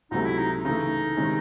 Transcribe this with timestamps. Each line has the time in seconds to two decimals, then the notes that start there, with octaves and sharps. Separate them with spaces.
0.11 C#2 C3 F#3 A3 D#4
0.25 E4
0.38 D#4
0.65 C#3 E3 A3 D#4
1.17 C3 D#3 G#3 C#4